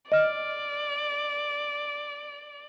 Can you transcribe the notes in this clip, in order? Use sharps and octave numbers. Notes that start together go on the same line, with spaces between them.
D5 D#5 F6